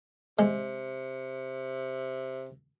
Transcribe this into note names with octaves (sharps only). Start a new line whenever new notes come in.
C3 G#3